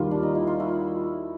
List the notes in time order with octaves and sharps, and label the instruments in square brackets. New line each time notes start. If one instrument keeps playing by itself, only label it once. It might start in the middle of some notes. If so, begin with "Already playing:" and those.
Already playing: [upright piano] D#2 D#3 G3 [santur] F4
[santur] D4
D#4
E4
F4
E4 F#4